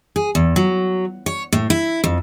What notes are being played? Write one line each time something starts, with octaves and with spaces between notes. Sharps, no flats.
G#4
E2
F#3
C#5
A2
E4
F2